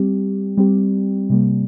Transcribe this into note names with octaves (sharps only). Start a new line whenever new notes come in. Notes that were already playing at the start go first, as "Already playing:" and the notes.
Already playing: G3 C4 G4
G3 C4 G4
C3 G3 A#3